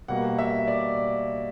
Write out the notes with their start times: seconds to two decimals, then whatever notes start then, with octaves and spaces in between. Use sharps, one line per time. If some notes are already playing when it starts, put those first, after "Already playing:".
0.08 B2 G3 A#3 F#5
0.39 E5
0.68 D5